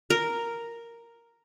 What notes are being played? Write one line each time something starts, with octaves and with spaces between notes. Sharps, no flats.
A#4